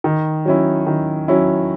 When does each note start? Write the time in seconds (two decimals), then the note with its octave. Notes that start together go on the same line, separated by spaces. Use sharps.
0.04 D#3
0.45 F#3 C#4 E4
0.87 D#3
1.28 F#3 C#4 E4